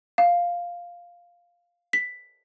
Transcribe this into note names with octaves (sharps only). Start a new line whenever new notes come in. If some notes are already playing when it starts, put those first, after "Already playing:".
F5
B6